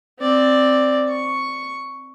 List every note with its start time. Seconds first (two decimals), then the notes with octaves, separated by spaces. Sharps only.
0.20 C4 D5
1.09 C#6